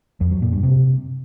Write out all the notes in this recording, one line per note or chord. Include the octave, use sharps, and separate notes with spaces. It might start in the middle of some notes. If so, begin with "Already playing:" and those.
F2
F#3
A#2
G2
C3